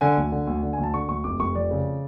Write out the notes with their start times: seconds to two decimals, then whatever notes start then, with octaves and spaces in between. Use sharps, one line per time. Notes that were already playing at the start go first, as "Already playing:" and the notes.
0.01 D3 G#5
0.17 D2
0.32 D3
0.47 D2
0.63 D3
0.73 G#5
0.78 D2
0.83 A5
0.94 D3 C#6
1.08 D2 C#6
1.24 F1 D6
1.40 F1 C#6
1.55 F2 D5
1.71 C#3